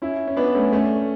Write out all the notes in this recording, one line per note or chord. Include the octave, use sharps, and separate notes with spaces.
C#4 E4
C#4
B3 D4
A3 C#4
A3 C#4